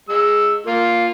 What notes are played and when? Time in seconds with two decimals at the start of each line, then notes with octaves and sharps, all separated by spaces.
0.09 G#3 E6
0.66 A#3 F4